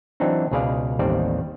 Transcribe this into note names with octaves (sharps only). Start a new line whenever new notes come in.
E3 F#3 C4 D4 D#4
C#2 B2 G#4 B4 D5 F5
A1 D#2 D#3 G3 C4 D5